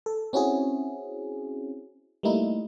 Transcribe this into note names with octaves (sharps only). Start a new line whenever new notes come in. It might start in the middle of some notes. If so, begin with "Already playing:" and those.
A4
C4 C#4 E4 F#4 G#4
G3 A3 A#3 D#4 E4